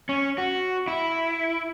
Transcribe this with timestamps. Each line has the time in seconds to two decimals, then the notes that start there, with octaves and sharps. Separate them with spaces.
0.09 C#4
0.38 F#4
0.88 E4